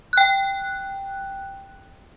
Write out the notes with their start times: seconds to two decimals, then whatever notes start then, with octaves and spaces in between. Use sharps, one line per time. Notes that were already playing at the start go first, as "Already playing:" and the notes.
0.13 G5 F#6